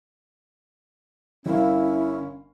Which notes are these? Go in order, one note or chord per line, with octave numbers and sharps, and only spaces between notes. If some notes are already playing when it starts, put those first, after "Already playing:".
G1 C#4 E4 A#4 F5